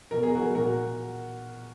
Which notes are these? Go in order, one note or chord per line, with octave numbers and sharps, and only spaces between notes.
B2 A#4
G#4
F#4 A#4
A#2 F#4 A#4